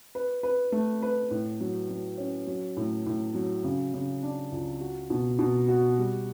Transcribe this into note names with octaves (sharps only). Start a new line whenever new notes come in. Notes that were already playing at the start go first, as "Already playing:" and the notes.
B4
B4
A3
B4
A2
F#3
F#3
C#4
F#3
A2
A2
F#3
C#3
C#3
D4
C#2
F#4
B2
B2
F#4
G3